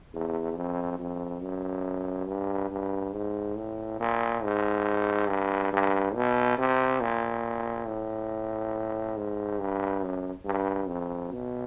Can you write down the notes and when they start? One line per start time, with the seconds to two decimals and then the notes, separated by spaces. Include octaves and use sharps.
0.14 E2
0.57 F2
0.99 F2
1.42 F#2
2.28 G2
2.71 G2
3.14 G#2
3.57 A2
4.00 A#2
4.44 G#2
5.29 G2
5.73 G2
6.15 B2
6.58 C3
7.01 A#2
7.87 A2
9.17 G#2
9.59 G2
10.03 F#2
10.45 G2
10.89 F2
11.32 B2